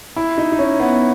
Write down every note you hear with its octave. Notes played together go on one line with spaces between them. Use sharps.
E4
D#4
D#4
C#4
B3